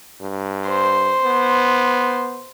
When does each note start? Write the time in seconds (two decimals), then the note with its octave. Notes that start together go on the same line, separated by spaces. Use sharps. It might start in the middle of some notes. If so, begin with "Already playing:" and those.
0.21 G2
0.68 C5
1.24 B3